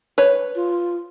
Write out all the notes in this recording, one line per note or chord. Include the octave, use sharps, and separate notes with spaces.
B4 C#5
F4